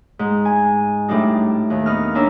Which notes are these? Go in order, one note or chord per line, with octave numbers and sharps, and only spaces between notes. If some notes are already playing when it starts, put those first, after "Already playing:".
G#2
G#5
A2 G3 D4 D#4
D#2
B3 D#4 F6
A#3 C#4 D4 A#4 E6